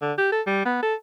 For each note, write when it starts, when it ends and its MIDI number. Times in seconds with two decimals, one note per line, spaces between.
0.02 0.13 50
0.18 0.31 67
0.32 0.42 69
0.47 0.62 55
0.65 0.82 59
0.83 0.94 69